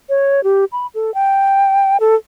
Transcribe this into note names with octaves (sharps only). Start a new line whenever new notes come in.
C#5
G4
B5
A4
G5
A4